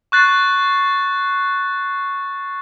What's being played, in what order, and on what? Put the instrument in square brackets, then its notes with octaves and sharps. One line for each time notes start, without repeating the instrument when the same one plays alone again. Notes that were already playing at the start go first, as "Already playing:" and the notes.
[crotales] C#6 F#6 A6 C7